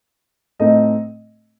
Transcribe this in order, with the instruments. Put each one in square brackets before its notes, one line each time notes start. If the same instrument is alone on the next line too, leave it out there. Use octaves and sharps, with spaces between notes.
[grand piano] A2 A3 C4 D#4 D#5